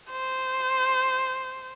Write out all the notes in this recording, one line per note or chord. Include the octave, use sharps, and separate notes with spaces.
C5